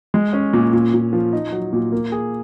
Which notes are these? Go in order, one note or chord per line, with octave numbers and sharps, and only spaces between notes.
G#3
C#4
A#2
A#2
A#2
F3
D#4
F#3
A#2
A#3
G#4